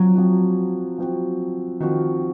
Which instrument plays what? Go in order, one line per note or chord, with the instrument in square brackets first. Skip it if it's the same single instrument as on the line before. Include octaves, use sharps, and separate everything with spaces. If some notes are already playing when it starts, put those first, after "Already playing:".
Already playing: [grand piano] F3 C4 F#4 [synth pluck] F#3
[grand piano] F3 C4 F#4
F3 C4 F#4
[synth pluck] D#3 [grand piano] F3 C4 F#4